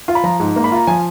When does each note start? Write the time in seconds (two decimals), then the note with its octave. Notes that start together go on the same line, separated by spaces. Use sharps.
0.08 F4
0.15 B5
0.24 F3 A#5
0.40 G#2
0.56 A#3
0.64 B5
0.72 F4 A#5
0.87 F3 G#5